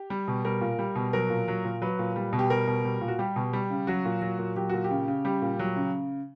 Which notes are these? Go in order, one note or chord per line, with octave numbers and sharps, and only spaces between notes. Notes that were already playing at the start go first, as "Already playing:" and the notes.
Already playing: G4
G3
B2
G3 A#4
A#2
G3
B2
F#3 A#4
A#2
F#3
A#2
F#3 B4
A#2
G3
B2
G4
G3 A#4
B2
G3
A#2
F#4
G3 G4
B2
G3
C#3
F#3 F#4
A#2
F#3
A#2
F#3 G4
A#2 F#4
G4
C#3
C#3
G3 G4
A#2
F#3
C#3